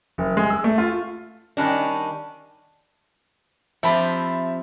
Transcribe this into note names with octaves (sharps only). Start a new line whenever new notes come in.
F#1
G#3
E6
A3
F4
D#3 G3 C#4 D4
F3 C4 G4 E5 A5 B5